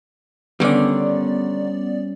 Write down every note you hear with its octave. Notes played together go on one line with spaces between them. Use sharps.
D3 D#3 G3 B3 C#4 D5